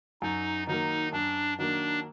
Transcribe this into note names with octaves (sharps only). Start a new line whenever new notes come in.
F#2 D#4
D#3 F#3 A#3 D#4
F#2 D4
D#3 F#3 A#3 D4